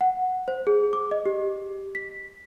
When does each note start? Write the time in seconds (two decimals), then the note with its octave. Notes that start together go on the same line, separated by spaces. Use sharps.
0.01 F#5
0.48 C5
0.67 G#4
0.93 D6
1.11 D#5
1.26 G4
1.95 B6